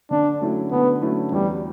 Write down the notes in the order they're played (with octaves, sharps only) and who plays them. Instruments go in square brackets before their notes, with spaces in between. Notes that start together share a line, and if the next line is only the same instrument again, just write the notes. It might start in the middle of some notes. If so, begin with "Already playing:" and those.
[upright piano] D3 [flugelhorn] D4
[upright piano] F#3 A3 C#4 E4
[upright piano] D3 [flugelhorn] B3
[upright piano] F#3 A3 C#4 E4
[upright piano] E2 [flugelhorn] G3